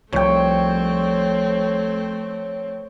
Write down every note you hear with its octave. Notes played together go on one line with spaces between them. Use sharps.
C2 F3 A3 C4 C#5 G5